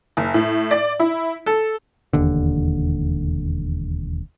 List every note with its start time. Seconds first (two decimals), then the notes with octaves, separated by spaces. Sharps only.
0.17 F#1
0.34 A2
0.71 D5
1.00 E4
1.46 A4
2.13 E1 D#2 D3